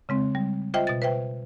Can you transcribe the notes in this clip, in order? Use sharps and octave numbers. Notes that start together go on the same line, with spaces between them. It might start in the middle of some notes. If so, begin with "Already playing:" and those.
C#3 G#3 C4
G3
F4 C5 D#5 E5 G5
B2 A6
B4 C5 E5 G5